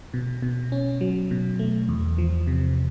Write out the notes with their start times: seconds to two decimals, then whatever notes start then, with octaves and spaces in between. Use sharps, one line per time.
0.14 B2
0.42 B2
0.72 C#4
1.01 F#3
1.31 B2
1.59 A3
1.89 E2
2.18 F3
2.47 C3